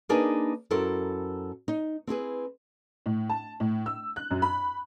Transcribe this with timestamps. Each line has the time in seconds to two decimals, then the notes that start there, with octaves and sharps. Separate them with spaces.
0.09 A#3 D4 D#4 G#4 A#4 B4
0.71 F#2 E4 A4 A#4 C5
1.68 D#4
2.07 C4 E4 G#4 B4
3.06 A2
3.30 A5
3.60 A2
3.86 E6
4.16 F#6
4.31 F#2
4.42 B5